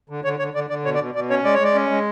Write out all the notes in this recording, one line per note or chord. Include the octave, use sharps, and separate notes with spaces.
D3
D3 C#5
D3 C#5
D3 D5
D3 D5
B2 C#5
D5
B2
B2 D5
C#4 C#5
G#3 D5
C#5
G#3 D5
C#4
G#3